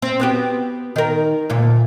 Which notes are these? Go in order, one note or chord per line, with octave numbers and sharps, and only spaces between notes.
C4
B3 F#4 G4
D#3 A#4
D2 A#2